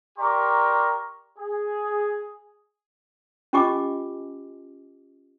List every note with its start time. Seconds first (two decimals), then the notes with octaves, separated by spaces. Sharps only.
0.19 G4 A#4 D5 A#5 C6 C#6
1.38 G#4
3.53 C#4 F4 G4 D#5 G#5 D6